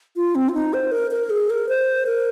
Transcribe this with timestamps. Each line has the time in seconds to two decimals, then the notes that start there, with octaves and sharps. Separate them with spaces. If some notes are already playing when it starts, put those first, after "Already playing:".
0.16 F4
0.35 C4
0.49 F4
0.54 D#4
0.73 C5
0.91 A#4
1.11 A#4
1.30 G#4
1.50 A#4
1.69 C5
2.06 A#4